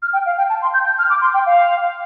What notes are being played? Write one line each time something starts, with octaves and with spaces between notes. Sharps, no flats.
F6
G5
F5
G5
A5
C6
G6
G6
F6
D6
C6
G5
F5